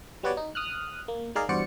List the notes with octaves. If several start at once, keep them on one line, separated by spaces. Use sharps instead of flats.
G3 B3 F#4 B4 C#5 D5
D#4
D#6 F6 F#6
A#3
G#3 D#4 G#4 A#4 D5 F5
E2 G2 F#4 C5 D5 C#7